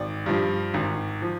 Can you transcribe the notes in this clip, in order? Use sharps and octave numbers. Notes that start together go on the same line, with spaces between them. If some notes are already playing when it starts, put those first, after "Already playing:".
Already playing: G#1 D5
G2 F3
G#1
F3